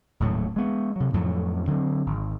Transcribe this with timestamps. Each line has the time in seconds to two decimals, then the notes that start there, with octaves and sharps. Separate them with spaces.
0.20 D#1 A2 F#3
0.56 G#3 B3
0.96 C3 F#3
1.14 F2 A2 F3 F#3
1.67 D3 F#3 C4
2.06 G#1